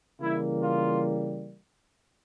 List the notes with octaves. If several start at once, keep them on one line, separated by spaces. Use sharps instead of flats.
C#3 E3 G3 A#3 E4
F4